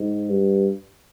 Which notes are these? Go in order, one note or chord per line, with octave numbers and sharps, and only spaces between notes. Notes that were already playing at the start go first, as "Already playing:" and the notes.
Already playing: G#2
G2